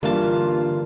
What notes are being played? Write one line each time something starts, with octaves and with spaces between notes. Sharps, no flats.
G2 D3 E3 A#3 F4 A5